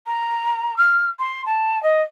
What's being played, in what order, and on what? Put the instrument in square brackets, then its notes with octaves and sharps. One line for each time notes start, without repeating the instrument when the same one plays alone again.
[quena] A#5
F6
C6
A5
D#5